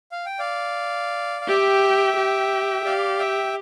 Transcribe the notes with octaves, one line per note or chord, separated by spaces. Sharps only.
F5
G5
D5 F5
F5
G4 E5 G5
G4
G4 D5 F5
E5 G5